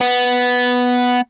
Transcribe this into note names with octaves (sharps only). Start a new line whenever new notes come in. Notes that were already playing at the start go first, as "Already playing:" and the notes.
B3